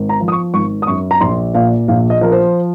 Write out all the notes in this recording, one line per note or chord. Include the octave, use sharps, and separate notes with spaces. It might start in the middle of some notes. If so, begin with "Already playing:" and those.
Already playing: G#1
A#5
F3
D#6
C#6
G#1 C#6
D#6
F#2 C#6
A#5
A#1 C6
A#2 F5
A#1 F5
D#5
F3 A#4
C5